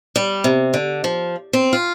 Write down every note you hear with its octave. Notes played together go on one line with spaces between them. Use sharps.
G3
C3
D3
F3
C4
F4